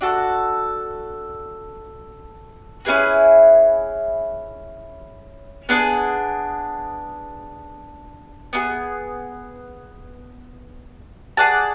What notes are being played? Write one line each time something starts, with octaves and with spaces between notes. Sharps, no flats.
D4 F#4 A4
C#4 E4 G#4 B4
B3 D4 G#4
B3 D4 G#4
G#4 D5 F#5 A5